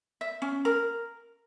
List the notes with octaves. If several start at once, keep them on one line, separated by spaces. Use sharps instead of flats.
E5
C#4
A#4